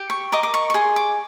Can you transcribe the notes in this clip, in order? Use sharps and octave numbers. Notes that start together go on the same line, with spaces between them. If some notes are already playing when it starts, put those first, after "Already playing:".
Already playing: G4
C#6
A#4 D#5 D6
D6
C#6
C#6
G#4 C6
D6